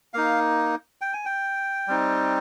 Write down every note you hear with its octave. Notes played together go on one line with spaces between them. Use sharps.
A#3 D#4 F5
G5
G#5
G5
G3 C4 D#4